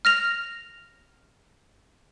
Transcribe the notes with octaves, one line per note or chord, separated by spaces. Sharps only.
F6 A#6 F7